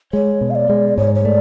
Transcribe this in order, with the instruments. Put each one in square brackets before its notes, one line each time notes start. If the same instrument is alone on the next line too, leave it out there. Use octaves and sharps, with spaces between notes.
[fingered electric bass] G#3 [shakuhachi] C#5
[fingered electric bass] B2
[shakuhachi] F5
D5
[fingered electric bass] G#3
[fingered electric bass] G#2 [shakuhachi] C#5
[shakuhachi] C#5
[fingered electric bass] A3 [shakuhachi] D5